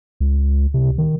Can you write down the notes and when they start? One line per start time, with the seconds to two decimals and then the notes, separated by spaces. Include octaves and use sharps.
0.20 C#2
0.74 C3
0.98 D#3